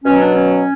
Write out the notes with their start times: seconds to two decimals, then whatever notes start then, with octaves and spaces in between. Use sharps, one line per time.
0.05 B2 F#3 C#4
0.20 D4
0.34 C#4